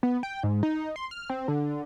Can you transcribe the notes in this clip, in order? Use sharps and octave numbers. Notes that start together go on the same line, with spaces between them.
B3
G5
G#2
D#4
C6
F6
C4
D3